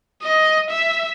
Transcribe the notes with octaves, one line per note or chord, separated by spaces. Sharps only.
D#5
E5